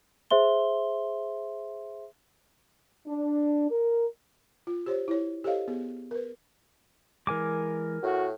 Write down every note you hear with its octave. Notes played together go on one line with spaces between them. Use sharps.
G#4 C5 E5 C6 G7
D4
A#4
F4
G4 C5 C#5
E4 C#5
G4 A4 C5 C#5 D#5 F5
B3 G#4
A#4 B4
E3 G#3 A#4 G#5 D6
A2 F#4